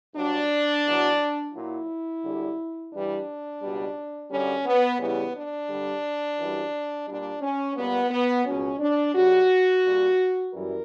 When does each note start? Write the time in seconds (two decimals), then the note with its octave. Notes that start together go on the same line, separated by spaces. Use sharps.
0.15 G2 F#3 D4
0.85 E2 B2 F#3
1.54 A#2 F#3 E4
2.23 F#2 D3 G3
2.92 G2 E3 G3 D4
3.62 C#2 B2 G3
4.30 F#2 D3 G3 C#4
4.66 B3
4.99 E2 C#3 E3 G3 B3
5.34 D4
5.69 G2 D3 G3
6.38 F#2 E3 G3
7.07 A#2 G3 D4
7.41 C#4
7.76 A#2 G3 B3
8.11 B3
8.45 C#2 B2 F#3 C#4
8.80 D4
9.14 F#2 C#3 G3 F#4
9.84 A#2 G3
10.53 F#2 E3 G3 A#4